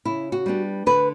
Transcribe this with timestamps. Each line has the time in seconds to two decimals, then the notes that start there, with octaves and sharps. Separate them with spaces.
0.05 C#3 E4
0.32 F#4
0.46 G3 B3 D4
0.86 D3 B4